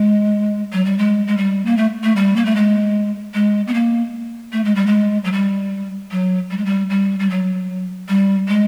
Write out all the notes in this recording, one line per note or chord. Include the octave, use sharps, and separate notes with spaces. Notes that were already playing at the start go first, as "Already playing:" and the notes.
Already playing: G#3
F#3
G3
G#3
G#3
G3
A#3
A3
A3
G3
A#3
A3
G#3
G#3
B3
A#3
A3
G#3
G3
G#3
F#3
G3
F#3
G3
G#3
G3
G3
G3
F#3
G3
G#3